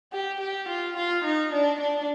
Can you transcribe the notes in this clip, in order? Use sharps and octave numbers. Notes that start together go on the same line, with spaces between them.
G4
G4
F4
F4
D#4
D4
D4